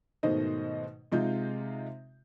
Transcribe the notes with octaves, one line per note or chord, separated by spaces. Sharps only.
G#2 B2 D#3 A3 C5 D#5
C3 G#3 D#4 F4 G6